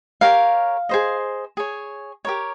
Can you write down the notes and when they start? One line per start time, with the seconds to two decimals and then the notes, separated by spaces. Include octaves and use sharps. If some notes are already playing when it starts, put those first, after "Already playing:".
0.21 G4 A#4 C#5 F5
0.89 G#4 C5 D#5
1.57 G#4 C#5
2.25 G4 A#4 C#5